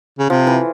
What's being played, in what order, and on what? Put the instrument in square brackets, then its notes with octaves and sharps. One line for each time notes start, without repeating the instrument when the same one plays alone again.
[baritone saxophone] C#3
[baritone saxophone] C3 [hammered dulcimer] F3
[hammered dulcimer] E3